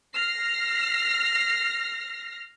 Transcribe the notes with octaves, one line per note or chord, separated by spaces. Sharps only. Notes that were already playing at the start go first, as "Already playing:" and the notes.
F6 A#6 C7